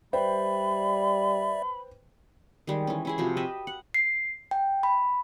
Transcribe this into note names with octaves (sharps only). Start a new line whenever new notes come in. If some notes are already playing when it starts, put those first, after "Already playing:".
G3 B4 C5 D5 E5 G5 B5
D#3 G3 G#3
E3 C#4
C#4 E4 G#4
C3 F3 F#4
G4 B4 D#5 E5
F#5
C7
G5
B5